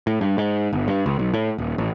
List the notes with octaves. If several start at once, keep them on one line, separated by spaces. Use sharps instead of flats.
A2
G2
G#2
G1
G2
C#2
B1
A2
D#1
A1